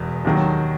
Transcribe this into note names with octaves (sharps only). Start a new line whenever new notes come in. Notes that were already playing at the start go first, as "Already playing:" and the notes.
Already playing: E1 E2 B2
D#2 D#3 F#3